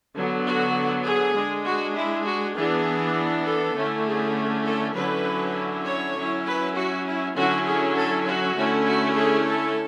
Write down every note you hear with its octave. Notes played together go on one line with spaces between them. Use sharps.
D3 F#3 B3
F#4
G#4
G#3 D4
F#4
E4
F#4
E3 B3 D4 G#4
A4
D3 A3 C#4 E4
G#4
A4
D3 F#3 C#4 E4 B4
C#5
F#3 C#4 E4
B4
F#4
E4
D3 F#3 C#4 E4 F#4
G#4
A4
F#4
D3 A3 C#4 E4
F#4
G#4
A4